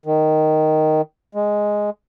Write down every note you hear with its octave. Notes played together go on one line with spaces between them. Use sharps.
D#3
G#3